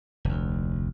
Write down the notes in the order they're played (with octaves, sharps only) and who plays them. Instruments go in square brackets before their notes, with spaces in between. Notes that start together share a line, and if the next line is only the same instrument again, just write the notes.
[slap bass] F1 D2